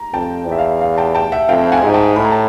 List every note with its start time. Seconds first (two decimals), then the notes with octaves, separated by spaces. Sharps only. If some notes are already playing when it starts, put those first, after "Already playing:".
Already playing: A#5
0.13 F2 G5 A5
0.47 E2
0.52 E5
0.58 F5
0.81 F5
0.98 G5 A5
1.15 G5 A5
1.32 E5 F#5
1.48 F2 F5 G5
1.72 F#5 G#5
1.83 G#2
1.94 G5 A5
2.16 A2 B5
2.24 A#5
2.32 A5